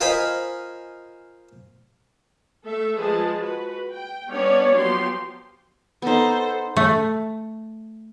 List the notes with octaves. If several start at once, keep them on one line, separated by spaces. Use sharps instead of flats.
F4 A#4 C5 D#5 G#5 B5
A3 A4 E5
F3 G#3 G#4 B4 A5
F#4 B4
G5
G3 B3 C#4 D4 C#5 D5
F3 F#3 B3 G4 C6
B3 D#4 A4 C5
A3